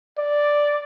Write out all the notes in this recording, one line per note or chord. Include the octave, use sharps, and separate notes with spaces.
D5